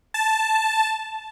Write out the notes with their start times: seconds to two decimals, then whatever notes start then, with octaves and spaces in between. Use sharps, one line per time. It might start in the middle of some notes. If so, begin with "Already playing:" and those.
0.14 A5